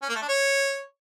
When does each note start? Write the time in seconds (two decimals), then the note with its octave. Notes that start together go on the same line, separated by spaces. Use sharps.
0.02 C#4
0.09 A#3
0.15 A3
0.22 D4
0.29 C#5